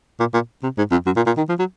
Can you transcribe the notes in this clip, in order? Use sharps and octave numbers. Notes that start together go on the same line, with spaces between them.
A#2
A#2
C3
G#2
F2
F#2
A#2
A#2
D#3
F3
F#3